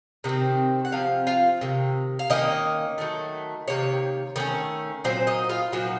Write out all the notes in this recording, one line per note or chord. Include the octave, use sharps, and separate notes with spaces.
C3 D#3 C4
F#5
C3 F3 C4 F5
F4 F5
C3 D#3
F5
D#3 A#3 C#4 D#4 D#5
D#3 F#3 A3
C3 D#3 A#3 C#5
D#3 A3 C#4
A#2 F#3 C4 C5
D#4 D#5
F4 F5
A#2 F3 F#3 C4 D#4 F#4